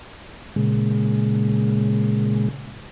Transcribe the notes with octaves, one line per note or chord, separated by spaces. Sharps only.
A#2 C#3 G#3